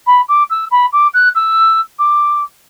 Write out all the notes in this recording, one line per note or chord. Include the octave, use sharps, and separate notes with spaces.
B5
D6
E6
B5
D6
F#6
E6
D6